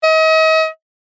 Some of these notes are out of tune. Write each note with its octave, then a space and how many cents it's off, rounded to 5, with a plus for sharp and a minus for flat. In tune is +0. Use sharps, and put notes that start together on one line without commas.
D#5 +40